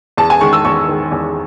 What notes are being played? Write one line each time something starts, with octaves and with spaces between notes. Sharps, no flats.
E2 A5
G#5
D#3 G#3 C#6
E6
E2 C#6
D#3 G#3
E2